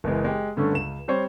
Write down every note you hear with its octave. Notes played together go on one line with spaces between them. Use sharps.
F#1 E3 G#3
G#3 G4
G2 D3 A3 C#4
C#2 E7
G3 C4 C5 C#5